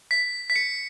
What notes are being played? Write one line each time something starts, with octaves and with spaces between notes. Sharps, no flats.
B6
B6
C#7